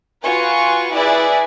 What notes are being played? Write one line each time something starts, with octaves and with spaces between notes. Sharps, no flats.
F4 F#4 B4 G#5 C#6
E4 G#4 B4 D5 E5